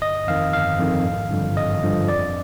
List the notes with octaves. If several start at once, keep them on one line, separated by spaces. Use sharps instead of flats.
G1 D#5
F2 D#3 F5
G1 F5
F2 D#3
G#1
G2 D3 F3
G#1 D#5
G2 D3 F3
F2 D5